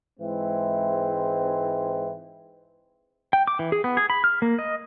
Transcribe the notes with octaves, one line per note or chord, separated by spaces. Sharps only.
G#2 E3 G#3 C4 E4
G5
D6
E3
G#4
B3
G#4
B5
F6
A#3
D#5